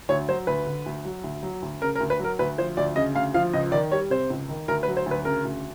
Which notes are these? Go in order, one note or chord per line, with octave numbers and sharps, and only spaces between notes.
D2 C#5
F#3 C5
D2 B4
D3
D2
F#3
D2
F#3
D2
C#3 A#4
A#4
D2
B4
F#3 A#4
D2 B4
F3 C5
D2 D5
C#3 D#5
D2 F5
F3 F5
C#2 D#5
D#3 D5
G3 C#5
C3 C5
C#2
D#3
D2 A#4
B4
F#3
C5
D2 B4
C#3 A#4
D2